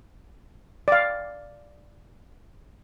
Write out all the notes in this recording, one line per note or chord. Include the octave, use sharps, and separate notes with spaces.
D5 F5